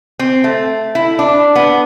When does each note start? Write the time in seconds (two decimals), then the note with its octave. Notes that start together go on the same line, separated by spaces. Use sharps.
0.19 C4
0.44 A3
0.95 E4
1.19 D4
1.56 B3